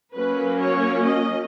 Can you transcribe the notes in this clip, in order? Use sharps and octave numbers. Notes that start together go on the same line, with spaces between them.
F#3 A#3 C#4 B4
C#5
D#5